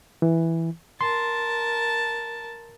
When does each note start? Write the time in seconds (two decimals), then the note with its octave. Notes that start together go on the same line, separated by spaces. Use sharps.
0.22 E3
1.01 A#4 A5 C6